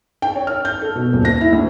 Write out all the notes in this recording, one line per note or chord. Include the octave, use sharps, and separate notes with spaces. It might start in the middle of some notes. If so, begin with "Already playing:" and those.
G5
C#5
F6
G6
A4
B2
D#1
A#6
E4
D2